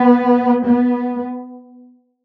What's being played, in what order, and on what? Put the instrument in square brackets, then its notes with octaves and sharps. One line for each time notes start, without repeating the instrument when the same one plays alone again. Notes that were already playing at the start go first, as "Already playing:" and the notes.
Already playing: [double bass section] B3
B3